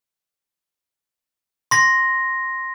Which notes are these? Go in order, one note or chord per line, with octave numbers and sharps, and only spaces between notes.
C6 A#6